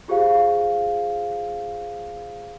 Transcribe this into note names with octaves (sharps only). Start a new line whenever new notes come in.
F4 G4 G#4 C5 F5